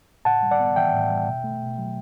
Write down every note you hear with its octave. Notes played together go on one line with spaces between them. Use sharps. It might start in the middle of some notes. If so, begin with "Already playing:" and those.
A2 F#5 A5
G3
D5 F#5
B3
E3 E5 G5
A2
G3
B2
A3
B2
F#3